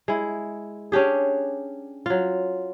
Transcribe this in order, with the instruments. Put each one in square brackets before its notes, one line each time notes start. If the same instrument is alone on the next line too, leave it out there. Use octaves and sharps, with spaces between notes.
[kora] G#3 E4
C#4 D4 G4 G#4
F#3 F4